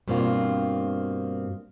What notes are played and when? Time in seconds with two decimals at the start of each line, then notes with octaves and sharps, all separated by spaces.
0.08 G2 B2 A#3 C4 F4